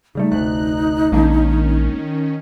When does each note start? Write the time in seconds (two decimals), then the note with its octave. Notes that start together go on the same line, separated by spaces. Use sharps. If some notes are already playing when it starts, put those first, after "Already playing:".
0.15 C#3 G3 A3 D#4
0.31 F1 D2 A3 F#6
1.12 A#1 D#3 G#3 A#3 C#4 D4